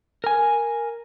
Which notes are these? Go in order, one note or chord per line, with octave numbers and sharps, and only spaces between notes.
A#4 G#5